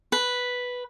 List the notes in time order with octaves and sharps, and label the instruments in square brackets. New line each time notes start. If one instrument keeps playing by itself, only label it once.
[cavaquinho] B4